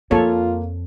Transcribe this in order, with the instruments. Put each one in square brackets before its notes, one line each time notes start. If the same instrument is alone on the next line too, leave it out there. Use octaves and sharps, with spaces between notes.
[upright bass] F2 [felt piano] A#3 [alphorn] F4 [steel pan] A4 C#5